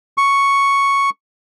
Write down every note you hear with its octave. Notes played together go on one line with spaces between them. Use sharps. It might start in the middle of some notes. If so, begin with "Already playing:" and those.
C#6